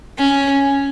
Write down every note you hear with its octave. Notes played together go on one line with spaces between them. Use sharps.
C#4